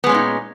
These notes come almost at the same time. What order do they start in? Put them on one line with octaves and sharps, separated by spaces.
B3 G#3 C#4 A#2 D#4